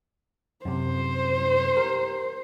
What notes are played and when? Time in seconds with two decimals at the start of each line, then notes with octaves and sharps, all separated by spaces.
0.65 F#2 C3 C5
1.77 G4 A#4